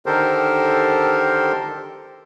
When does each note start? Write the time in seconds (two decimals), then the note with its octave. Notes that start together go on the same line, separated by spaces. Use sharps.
0.06 D3 D#3 G4 A4 A#4 C5